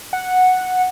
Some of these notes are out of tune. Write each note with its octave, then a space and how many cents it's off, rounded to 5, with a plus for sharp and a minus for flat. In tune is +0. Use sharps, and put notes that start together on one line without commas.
F#5 -5